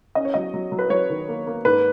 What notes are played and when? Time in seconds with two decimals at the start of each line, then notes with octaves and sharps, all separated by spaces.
0.15 C#4 D#5
0.25 C#5
0.34 F#3 D#5
0.54 F#3
0.72 F#3
0.79 B4
0.90 F#3 C#5
1.10 D#3
1.28 A#3
1.46 A#3
1.65 G#2 B4